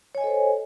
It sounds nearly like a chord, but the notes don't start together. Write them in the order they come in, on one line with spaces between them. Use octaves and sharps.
C#5 G#5 D#5 A4 C5